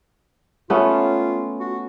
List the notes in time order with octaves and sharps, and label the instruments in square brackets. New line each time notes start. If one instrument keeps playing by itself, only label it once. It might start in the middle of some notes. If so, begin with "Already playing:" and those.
[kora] A3 B3 C#4 [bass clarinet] F4
[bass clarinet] F#4